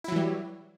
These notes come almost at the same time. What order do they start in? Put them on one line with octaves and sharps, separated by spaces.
E4 F#3 E3 G3